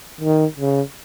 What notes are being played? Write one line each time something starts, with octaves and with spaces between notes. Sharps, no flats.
D#3
C#3